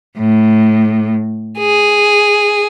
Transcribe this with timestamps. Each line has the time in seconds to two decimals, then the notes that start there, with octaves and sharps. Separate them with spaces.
0.17 A2
1.60 G#4